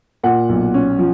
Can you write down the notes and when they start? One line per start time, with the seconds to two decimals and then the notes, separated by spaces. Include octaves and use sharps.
0.24 A#2 F#5
0.49 B1
0.74 C#4
0.99 F3